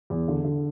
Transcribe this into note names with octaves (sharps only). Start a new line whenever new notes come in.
E2
D3
D3